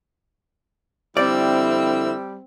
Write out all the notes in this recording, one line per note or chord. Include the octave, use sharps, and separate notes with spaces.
F2 D3 G3 C4 E4 D5 E6